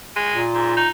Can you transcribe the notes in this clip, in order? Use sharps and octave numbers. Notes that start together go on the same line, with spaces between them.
G#3
A#2
G#2
D#4